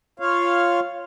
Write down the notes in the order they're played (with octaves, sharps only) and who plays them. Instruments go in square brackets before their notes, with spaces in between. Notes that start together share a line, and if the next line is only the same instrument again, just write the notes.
[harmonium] F4 C#5 F5